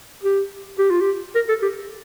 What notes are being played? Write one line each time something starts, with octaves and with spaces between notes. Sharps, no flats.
G4
G4
F4
G4
A#4
A4
G4